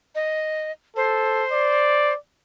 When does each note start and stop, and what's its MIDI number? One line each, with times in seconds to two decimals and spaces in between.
0.15 0.72 75
0.96 1.44 69
0.96 2.13 72
1.52 2.16 74